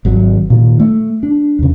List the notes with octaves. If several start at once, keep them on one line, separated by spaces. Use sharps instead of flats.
G#1 F#3
A#2 D#3
A3
D4
E2 C#3